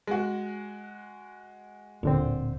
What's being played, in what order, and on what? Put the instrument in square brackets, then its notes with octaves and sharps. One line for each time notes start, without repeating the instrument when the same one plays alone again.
[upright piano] G#3 F#4
[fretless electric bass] D1 [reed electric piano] A#2 D3 C4